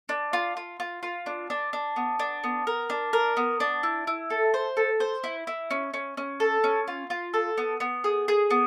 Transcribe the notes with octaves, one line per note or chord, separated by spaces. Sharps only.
D4
F4
F4
F4
F4
D4
D4
D4
B3
D4
B3
A#4
D4
A#4
B3
D4
E4
E4
A4
C5
A4
C5
E4
E4
C#4
C#4
C#4
A4
C#4
F4
F4
A4
B3
B3
G#4
G#4
B3